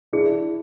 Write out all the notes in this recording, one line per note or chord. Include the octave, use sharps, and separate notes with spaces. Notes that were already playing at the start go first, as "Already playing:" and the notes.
D4 E4 G#4